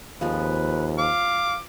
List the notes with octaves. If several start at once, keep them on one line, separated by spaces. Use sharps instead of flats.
D#2 F3 G#3 C4 B4
F5 D6